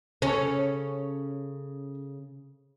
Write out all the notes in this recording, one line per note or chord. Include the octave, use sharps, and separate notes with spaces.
C#3 C#4 A4